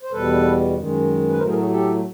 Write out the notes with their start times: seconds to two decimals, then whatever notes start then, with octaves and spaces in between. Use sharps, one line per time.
0.03 C5
0.12 E2 B2 G3 A4 B4
0.74 F#2 D#3 G#3
1.29 B4
1.38 A2 F#3 A3 A#4 C5
1.49 G#4 A#4
1.59 F#4 G#4
1.70 G4 A4